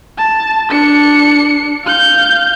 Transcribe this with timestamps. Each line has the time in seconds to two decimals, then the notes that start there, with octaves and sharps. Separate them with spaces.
0.18 A5
0.71 D4 C#7
1.84 F5 G6